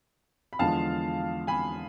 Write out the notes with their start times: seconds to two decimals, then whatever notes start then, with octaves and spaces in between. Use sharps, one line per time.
0.53 B5
0.59 E2 D3 F3 G#3 F5 A5
1.47 G#5 B5